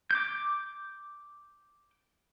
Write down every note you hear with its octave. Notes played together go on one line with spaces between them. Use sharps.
D6 G6